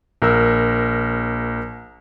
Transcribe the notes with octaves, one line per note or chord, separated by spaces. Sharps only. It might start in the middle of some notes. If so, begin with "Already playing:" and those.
A#1 A#4 E6